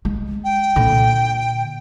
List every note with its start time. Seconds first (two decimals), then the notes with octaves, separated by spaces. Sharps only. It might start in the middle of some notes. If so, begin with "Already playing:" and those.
0.05 G#3
0.44 G5
0.76 A#2 D3